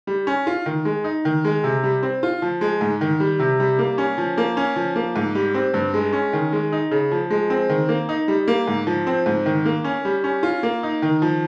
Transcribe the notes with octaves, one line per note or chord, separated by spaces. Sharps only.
G3
C#4
F4
D#3
G#3
D#4
D#3
G#3
C3
G3
C4
F4
F3
G#3
G#2
D#3
G3
C3
G3
A#3
C#4
F3
A#3
C#4
F3
A#3
G#2
G3
C4
G2
G#3
C#4
D#3
G#3
D#4
C#3
F3
G#3
C4
D#3
A#3
D#4
G3
A#3
G#2
F3
C4
G#2
D#3
A#3
C#4
G3
C#4
F4
A#3
D#4
D#3
F3